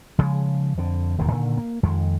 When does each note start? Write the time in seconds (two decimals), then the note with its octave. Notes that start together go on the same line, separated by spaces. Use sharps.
0.19 C#3 F3 F#3 G#3
0.78 F2 D3
1.18 E1 D#2 G#2 D#3
1.31 A#2 D3 D#3
1.58 A#3
1.83 F2 D#3 G#3